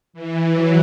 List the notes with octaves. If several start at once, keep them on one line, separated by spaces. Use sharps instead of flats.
E3
F#3